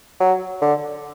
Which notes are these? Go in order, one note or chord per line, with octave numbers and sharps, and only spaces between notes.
F#3
D3